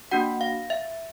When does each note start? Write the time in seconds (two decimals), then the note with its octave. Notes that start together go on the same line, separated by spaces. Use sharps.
0.11 A#3 D4 F#4 F#5
0.41 F5
0.70 E5